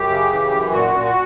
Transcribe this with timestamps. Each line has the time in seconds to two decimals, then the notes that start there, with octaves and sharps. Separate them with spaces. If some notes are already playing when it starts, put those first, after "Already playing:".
Already playing: F#2 G4
0.09 C#3
0.31 E3
0.50 F#2
0.71 A#2 F#4
0.93 A#2
1.04 F#4